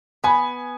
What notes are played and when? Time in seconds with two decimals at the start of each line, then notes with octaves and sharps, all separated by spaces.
0.24 B3 G#5